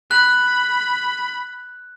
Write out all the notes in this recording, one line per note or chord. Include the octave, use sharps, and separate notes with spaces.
B5 F#6